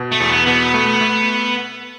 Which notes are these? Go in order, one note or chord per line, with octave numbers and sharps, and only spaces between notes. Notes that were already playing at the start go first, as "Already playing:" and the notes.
Already playing: B2
A3
E2
B3
B2 B3
A3
A3